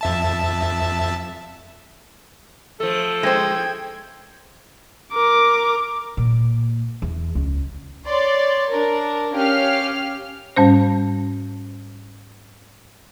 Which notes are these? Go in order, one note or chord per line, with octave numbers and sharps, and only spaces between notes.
F2 E5 A5
F3 A3 A4
G#3 C5 G5 G#6
A#4 D6
A#2
E2
C#2
C#5 D5 C6
D4 A#4
C#4 G4 F5 F6 C7
G#2 G3 C#4 C5